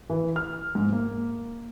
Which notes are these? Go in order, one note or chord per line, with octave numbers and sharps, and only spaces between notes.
E3
F6
G#2
A#3